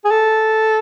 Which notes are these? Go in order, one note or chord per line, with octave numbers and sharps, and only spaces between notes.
G#4
A4